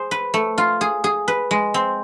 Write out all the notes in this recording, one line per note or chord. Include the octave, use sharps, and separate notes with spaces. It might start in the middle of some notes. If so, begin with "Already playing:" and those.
Already playing: G#4 C5
B4
A3
F4
G#4
G#4
B4
G#3
C4